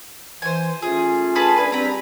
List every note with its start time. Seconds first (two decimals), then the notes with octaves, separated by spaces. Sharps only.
0.42 E3 C5 G#5
0.82 A3 C#4 F4 G#4
1.35 G#4 B4 A5
1.57 D4 B4 G#5
1.72 G3 C4 A#5 B5